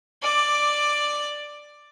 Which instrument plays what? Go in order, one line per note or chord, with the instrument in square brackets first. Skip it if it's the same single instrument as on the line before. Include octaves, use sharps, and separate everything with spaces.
[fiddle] D5 D6